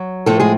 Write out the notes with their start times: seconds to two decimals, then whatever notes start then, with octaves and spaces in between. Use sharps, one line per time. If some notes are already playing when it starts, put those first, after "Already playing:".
Already playing: F#3
0.26 A2 F3 A3 A4
0.40 G#3 G#4